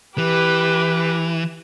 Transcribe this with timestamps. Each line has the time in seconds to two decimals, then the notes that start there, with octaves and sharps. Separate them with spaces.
0.18 E3 G4 B4